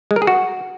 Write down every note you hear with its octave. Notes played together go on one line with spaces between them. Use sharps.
G#3
A#4
G#4
F#4